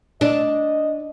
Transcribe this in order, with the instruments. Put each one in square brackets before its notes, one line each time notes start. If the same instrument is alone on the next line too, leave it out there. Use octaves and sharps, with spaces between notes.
[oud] D4 [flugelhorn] D#5